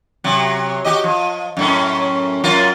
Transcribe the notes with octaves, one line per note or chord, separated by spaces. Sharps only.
C3 F#3
F#4 G4 D#5
F3
F#2 A2 C#4
F#2 F4 A#4